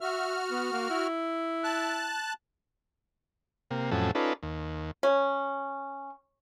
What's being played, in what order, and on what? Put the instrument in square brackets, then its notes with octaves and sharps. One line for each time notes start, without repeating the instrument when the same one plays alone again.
[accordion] F#4 F6 [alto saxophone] E5
[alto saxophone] B3
A#3
E4
[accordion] A5 F#6
[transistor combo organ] C3 A#3
F2 A2 F#3 C#4 A4
C#4 D#4 F4 A4 B4 D5
D#2
[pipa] C#4